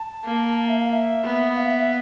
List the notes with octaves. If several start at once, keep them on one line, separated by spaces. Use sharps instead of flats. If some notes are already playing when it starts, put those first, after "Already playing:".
Already playing: A5
A#3
A5
E5
F5
E5
B3
F5
E5
E5